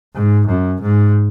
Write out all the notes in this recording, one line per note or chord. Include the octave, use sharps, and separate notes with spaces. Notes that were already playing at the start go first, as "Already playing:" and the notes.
G#2
F#2
G#2